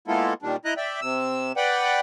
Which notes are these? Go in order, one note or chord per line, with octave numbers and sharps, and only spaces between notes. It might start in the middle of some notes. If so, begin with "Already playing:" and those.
G#3 A#3 B3 E4 F4 A4
A#2 D#3 G3 D4
E4 D#5 A#5 F#6
D5 E5 G5
C3 E6
B4 D5 F#5 G5